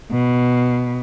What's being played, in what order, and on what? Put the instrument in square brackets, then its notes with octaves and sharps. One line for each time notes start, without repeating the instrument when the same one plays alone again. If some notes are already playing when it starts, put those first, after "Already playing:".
[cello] B2